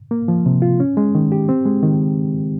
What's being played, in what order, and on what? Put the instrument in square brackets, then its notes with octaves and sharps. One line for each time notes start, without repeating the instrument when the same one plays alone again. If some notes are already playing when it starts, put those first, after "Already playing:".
[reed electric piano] A#3
F3
C3
F4
C#4
G#3
D#3
G4
C4
G#3
D#3